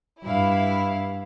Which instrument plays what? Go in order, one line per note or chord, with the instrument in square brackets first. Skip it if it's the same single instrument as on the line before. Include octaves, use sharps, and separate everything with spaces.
[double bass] G2 [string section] E4 F5